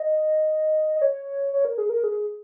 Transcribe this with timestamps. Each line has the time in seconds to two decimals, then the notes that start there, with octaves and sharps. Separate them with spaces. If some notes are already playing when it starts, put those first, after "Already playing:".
Already playing: D#5
0.96 D#5
1.02 C#5
1.53 C#5
1.65 A#4
1.78 G#4
1.89 A#4
2.04 G#4